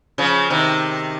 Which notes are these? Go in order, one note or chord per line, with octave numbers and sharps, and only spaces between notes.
C#3 F3
C3 D#3